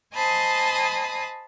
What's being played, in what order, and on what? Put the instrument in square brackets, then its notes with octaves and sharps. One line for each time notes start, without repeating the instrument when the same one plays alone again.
[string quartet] C5 D#5 G#5 A5 B5 D#6